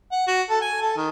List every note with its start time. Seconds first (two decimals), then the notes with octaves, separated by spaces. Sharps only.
0.12 F#5
0.27 F#4
0.50 A4
0.62 G#5
0.81 A4
0.97 D#3